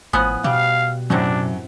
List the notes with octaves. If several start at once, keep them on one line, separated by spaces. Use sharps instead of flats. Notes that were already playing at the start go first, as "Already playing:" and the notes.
G#1 A2 F3 B3 G#5 D#6 F#6
B2 G3 F5
F#2 A2 C3 F#3 D4